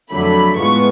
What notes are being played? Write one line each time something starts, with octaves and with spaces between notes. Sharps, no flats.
F2 D3 F#3 A3 B5
A2 G#3 B3 F4 C#6